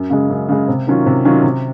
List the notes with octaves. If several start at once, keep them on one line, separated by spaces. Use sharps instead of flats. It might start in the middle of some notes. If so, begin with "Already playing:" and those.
Already playing: F#2
C#3 G#3
F#2
C#3 G#3
C3
D#3 F#3 C#4 F4
C3
D#3 F#3 C#4 F4
C3